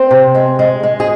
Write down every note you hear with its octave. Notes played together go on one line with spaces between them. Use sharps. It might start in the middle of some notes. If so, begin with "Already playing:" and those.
Already playing: C4 C5
C3
G#3
G#3
G#3
G#4